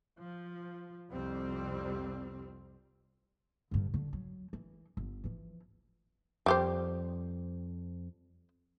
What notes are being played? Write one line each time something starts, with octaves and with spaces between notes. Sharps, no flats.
F3
C2 F2 G3 C4
G2 D3
G2 D3
F#3
E3
G1
E3 F3
F2 G3 G4 C5